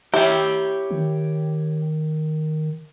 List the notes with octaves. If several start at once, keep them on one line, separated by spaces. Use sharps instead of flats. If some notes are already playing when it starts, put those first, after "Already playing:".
E4 G4 C#5 G5
D#3